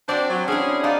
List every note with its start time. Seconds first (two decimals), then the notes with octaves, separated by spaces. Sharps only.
0.09 C4 D4 F#4 C5 D5
0.30 F#3
0.48 C#4 D4 E4 G#4
0.84 D4 D#4 F4 D5